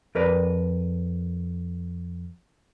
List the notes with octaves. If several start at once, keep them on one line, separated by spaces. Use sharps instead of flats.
F2 A#4 B4 D5